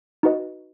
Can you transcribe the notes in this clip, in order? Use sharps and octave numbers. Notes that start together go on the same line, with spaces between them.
D#4 F#4 B4 D#5